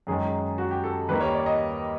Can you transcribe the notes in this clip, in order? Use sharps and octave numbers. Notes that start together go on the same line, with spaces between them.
F#2 D#3 G#3 G#4
F#4
G4
A4
D#2 D#3 G3 A#3 B4
C#5
D5
D#5